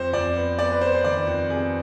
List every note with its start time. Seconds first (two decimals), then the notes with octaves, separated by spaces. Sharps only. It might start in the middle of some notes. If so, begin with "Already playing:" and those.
Already playing: F2 C5
0.13 F2 D5
0.36 B3
0.59 B3 D5
0.72 B4
0.81 B3 C5
0.95 C5
1.04 D#3 D5
1.27 F2
1.50 C3 G#4